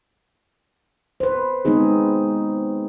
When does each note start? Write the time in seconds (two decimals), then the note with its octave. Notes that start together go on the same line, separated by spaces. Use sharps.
1.20 B4 C5
1.65 G#3 B3 C4 D#4 G#4